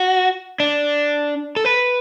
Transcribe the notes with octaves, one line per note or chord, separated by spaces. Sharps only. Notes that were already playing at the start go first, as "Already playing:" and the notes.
Already playing: F#4
D4
A4
B4